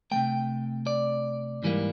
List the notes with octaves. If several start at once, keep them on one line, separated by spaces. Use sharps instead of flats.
C3 F3 A3 G5
D5
G#2 E3 G3 A#3